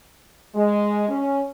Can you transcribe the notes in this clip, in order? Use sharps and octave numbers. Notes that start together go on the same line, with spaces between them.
G#3
C#4